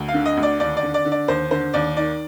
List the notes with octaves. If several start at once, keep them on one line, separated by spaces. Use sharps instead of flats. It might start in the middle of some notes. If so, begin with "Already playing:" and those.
Already playing: D2
F5
D3
D#5
D2
D5
D#2 D5
D5
D3
D5
D3
D5
D#2 C5
D3 C5
D#2 D5
D#3 D5